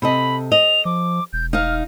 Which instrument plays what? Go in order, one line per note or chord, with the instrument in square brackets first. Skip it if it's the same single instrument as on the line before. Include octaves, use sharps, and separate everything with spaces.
[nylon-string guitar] C3 A4 D#5 [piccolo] B5
[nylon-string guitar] D#5 [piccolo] F7
[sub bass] F3 [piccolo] D6
[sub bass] E1 [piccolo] G6
[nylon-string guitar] D#4 F5 [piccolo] F6